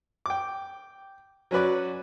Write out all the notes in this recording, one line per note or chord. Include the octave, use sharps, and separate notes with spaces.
G5 D6
F#3 C#4 F#4 B4 D5